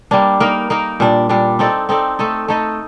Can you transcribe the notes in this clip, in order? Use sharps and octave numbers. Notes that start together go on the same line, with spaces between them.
G3 A#3 D4
A#3 D#4 A#4
A#3 D#4 A#4
A#2 G3 D4
A#2 G3 D4
C4 D#4 A4 D5
C4 D#4 A4 D5
A3 D#4 A4 D#5
A3 D#4 A4 D#5